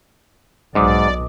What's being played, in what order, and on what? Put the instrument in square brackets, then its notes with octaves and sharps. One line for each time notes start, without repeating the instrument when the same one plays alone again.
[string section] B1 [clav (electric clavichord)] G#2 [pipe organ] D5 [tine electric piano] D#5 D6 D#6